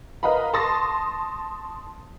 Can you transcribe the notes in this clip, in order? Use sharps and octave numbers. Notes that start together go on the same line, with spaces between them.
A#4 B4 D#5 F5 A#5 B5
A5 C6 C#6 D#6 A6 A#6